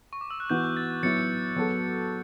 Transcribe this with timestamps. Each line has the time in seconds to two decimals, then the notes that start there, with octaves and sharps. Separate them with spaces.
0.13 C#6
0.21 D6
0.30 E6
0.40 F#6
0.50 E3 B3 F#4 B4 G6
0.77 A6
1.03 F#3 B3 E4 A6 C#7
1.56 F#3 B3 F#4 A4